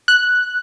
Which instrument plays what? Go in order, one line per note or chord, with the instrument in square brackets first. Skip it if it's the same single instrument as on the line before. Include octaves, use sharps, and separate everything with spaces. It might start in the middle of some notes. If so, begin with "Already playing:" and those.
[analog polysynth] F#6